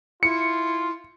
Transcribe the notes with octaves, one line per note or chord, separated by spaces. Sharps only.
E4 F4 C#7